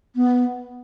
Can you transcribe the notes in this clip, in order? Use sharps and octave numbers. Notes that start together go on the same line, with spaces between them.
B3